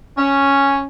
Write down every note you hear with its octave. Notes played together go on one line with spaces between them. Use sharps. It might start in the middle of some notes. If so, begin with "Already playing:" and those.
C#4